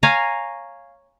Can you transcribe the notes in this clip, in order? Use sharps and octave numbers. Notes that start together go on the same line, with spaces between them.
C#5 F5 G#5 A#5